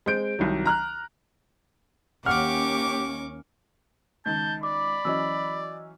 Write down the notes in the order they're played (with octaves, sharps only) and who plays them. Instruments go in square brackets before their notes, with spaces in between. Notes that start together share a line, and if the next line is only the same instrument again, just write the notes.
[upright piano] G#3 C4 G6 D7
C2 D#3 F#3
A#5 F6 F#6
[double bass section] D#2 A#3 C#4 [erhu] G4 [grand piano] F#5 F6 [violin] C#6 D6
[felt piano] C#2 D#3 [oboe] A5 [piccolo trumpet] G6
[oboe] D5 [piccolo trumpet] B5 [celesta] D6
[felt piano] E3 F#3 C#4 [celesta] D#5 E6